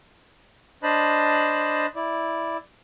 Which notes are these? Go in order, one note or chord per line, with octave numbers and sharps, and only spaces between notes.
D4 C5 D#5 A5 B5 F#6
E4 D5